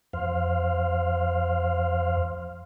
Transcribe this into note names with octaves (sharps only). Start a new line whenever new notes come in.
F2 C5 F5